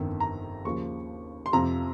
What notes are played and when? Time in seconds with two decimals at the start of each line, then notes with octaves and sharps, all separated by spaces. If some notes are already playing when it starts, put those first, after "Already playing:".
Already playing: G1 F2 D#3
0.20 A#5
0.65 D#2 C#3 F3 C#6
1.46 C6
1.53 F2 C3 F3 A#5